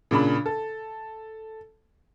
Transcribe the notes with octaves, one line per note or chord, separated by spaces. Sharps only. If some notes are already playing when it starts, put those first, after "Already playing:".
A#2 C#3 D4 B5
A4